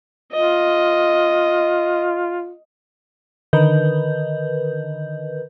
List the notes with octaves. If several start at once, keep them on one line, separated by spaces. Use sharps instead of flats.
F4 D#5
D3 D#3 A#4 B4 D#5 G6